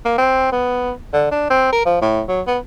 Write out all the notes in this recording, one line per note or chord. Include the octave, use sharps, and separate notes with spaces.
A#3
C4
B3
D3
D4
C4
A#4
F3
A2
F#3
B3